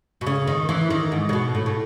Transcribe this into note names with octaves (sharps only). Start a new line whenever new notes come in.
B2
C#3
D#3
E3
D#3
G#2
C#3
B2
A2
A2